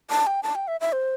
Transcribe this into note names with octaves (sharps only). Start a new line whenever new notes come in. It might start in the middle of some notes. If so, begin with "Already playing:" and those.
A5
G5
A5
G5
E5
E5
C5